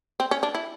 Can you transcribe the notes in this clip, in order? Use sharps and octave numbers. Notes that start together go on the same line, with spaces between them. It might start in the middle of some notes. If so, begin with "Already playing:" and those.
C4
C#4
D4
E4